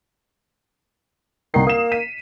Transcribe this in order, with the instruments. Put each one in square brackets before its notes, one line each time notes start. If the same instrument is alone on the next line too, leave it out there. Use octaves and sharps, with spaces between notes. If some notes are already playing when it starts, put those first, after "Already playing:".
[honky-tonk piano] C2 C7 [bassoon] D#3
[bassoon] A#3 [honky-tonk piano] D#6 E7
[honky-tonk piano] B6 D#7